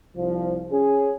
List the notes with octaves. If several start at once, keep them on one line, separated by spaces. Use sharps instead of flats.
C2 F3
C#4 G#4